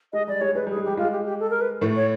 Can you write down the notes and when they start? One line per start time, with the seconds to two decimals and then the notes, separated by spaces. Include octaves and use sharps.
0.13 G#3 D#5
0.27 G3 D5
0.41 G#3 C#5
0.55 G#3 B4
0.67 G3 G#4
0.77 G#3
0.84 G3 G4
0.97 G#3 F4
1.12 G4
1.25 G4
1.40 A4
1.50 A#4
1.61 B4
1.81 A2 A3
1.96 C#5